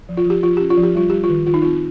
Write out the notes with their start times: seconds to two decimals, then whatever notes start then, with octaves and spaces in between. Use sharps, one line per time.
0.09 F3
0.17 F4
0.26 F3 G4
0.43 F3 F4
0.57 C#4 G4
0.70 F4
0.78 F3
0.83 G4
0.95 G3 F4
1.10 G3 G4
1.24 F4
1.29 D#3
1.47 D#3 F4
1.54 D#4
1.62 C4 F4